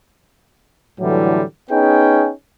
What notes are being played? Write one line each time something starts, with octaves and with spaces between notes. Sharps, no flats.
A2 D3 E3 F#3 G3
B3 C#4 D#4 G#4 G5